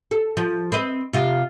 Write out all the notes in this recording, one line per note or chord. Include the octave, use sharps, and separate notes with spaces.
A4
F3
C4 B4 D#5
C3 F4 D#5